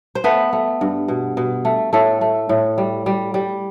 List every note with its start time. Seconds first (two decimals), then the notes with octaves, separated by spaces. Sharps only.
0.15 C5
0.24 A3 B3 B4
0.53 A3
0.81 G2
1.08 B2
1.37 B2
1.65 A3
1.93 A2 A3 A4
2.21 A3
2.49 A2
2.78 G3
3.06 G3
3.34 G3